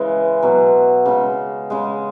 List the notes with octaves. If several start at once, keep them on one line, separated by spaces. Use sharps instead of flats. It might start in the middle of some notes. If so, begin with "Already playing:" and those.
Already playing: C#3 E3 G#3
B2 F#3
C#3 G#3
C#3 G#3